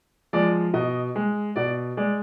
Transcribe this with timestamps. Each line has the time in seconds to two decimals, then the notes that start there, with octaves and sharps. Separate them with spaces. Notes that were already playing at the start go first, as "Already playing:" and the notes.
0.33 F3 G#3 D5
0.74 B2 D#5
1.16 G#3
1.56 B2 D5
1.97 G#3 D5